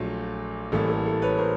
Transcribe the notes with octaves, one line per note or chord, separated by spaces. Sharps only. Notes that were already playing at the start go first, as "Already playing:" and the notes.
Already playing: A#1 A#2 F#3 A3 A4
A1 A2 E3 G3 A#3 A4
A4
A4
B4 C#5
A#4 C5